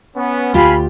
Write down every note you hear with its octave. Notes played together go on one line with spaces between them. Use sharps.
B3 C#4
D2 F4 G4 F5 G#5 B5